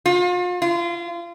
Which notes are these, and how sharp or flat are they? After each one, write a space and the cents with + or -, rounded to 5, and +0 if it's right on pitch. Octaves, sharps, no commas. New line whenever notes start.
F4 +40
F4 -30